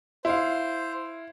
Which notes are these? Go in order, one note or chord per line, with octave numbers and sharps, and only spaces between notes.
E4 C5 F5